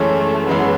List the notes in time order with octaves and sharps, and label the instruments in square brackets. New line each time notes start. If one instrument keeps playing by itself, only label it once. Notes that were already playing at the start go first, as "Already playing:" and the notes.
Already playing: [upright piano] F#2 E3 G#3 C#4 [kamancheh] A3
[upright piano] F#2 E3 G#3 C#4 [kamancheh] B3